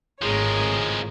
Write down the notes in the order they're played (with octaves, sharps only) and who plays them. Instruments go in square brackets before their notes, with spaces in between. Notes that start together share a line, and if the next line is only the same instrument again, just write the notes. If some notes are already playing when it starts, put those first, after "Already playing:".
[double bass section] G#1 A2 [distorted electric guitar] F3 G#3 [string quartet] G#4 A#4 C#5